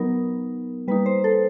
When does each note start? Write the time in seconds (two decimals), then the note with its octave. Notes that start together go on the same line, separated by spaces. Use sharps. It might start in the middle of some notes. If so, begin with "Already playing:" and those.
Already playing: F#3 B3 D#4 A#4
0.88 G3 A#3 D#4 B4
1.06 C5
1.24 A4